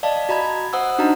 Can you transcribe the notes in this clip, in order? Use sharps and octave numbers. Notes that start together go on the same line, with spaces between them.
D5 D#5 F5 A5
F#4 D#5 A#5 B5 G#6
C5 F#5 D#6 E6
D4 D#4 F#4 D#5 A#5